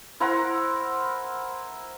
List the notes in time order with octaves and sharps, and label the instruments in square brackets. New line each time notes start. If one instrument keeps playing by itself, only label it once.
[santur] E4 A#4 C5 F#5